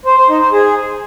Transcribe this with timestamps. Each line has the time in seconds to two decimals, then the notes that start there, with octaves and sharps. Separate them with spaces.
0.06 C5
0.17 C5
0.29 D#4
0.41 C5
0.52 G#4